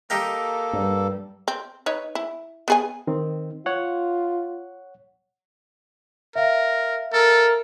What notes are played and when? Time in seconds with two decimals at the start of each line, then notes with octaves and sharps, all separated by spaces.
0.10 A#3 D#4 G4 A4 A#4
0.73 G2 G3
1.48 C4
1.86 D#4 B4 C#5
2.15 E4
2.68 B3 G#4 G#5
3.07 D#3 C4
3.66 F4 C#5 F#5
6.35 A#4 E5 F5
7.13 A4 A#4